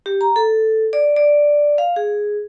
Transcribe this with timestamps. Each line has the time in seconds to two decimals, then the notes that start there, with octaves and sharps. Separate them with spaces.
0.06 G4
0.21 A#5
0.36 A4
0.93 D5
1.17 D5
1.78 F5
1.96 G#4